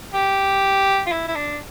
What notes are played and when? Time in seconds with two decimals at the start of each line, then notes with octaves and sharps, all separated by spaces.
0.14 G4
1.07 F4
1.12 E4
1.28 E4
1.35 D4